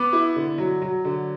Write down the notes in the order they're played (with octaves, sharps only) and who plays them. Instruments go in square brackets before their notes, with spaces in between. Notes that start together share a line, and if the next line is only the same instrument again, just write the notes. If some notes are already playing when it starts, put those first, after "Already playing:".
Already playing: [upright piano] B3 [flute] D6
[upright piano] E4
D3
F#3
F#3
D3